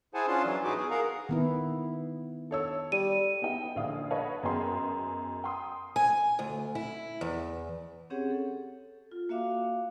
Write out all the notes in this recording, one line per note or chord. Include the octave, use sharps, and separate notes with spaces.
E4 G#4 C5 F#5 G#5 A5
C#4 D4 F4 A5 C6
E3 F#3
A2 D#4 F#4 G#4 B4 D6
B3 G#4
G#4 A#4 F5 F#5 A#5
D#3 B3 E4
A4 C#5 E6
G3 D#7
B3 D#4 E4 G5
A#1 D3 D4 E4 F5 D#6
B4 C#5 D#5 F5 F#5 A5
F#2 B3 G#4 D#5 G5 C6
G5 C6 D#6
G#5
D2
E4
E2
C4 C#4 G4 G#4 C#5 F#5
A4
F4
A#3 F#4 E5 F5 D6